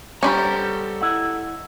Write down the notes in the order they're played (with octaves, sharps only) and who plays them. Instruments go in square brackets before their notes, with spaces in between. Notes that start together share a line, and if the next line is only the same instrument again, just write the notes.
[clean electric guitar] G3 B3 C5 [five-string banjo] C#4 G4 B5 [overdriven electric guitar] A4 A#5
[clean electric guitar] E4 D#5 F#5